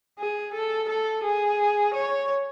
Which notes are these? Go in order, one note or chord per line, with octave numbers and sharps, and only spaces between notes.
G#4
A4
A4
G#4
C#5